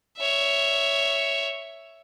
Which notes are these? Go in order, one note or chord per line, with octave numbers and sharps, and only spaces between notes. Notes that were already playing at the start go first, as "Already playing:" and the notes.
C#5 E5